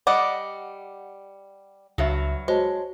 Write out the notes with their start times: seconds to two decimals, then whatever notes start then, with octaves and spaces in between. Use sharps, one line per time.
0.07 G3 D5 D#5 F#5
1.98 C#2 G2 F#3 F#4 E5
2.48 G#3 F#4 C5 C#5 A5